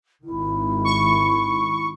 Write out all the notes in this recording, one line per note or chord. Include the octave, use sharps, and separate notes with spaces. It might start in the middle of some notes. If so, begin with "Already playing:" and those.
G#1 D#3 E4
C#6